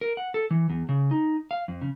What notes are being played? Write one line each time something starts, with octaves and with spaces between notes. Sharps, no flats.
A#4
F#5
A4
E3
E2
C#3
D#4
F5
F2
C#3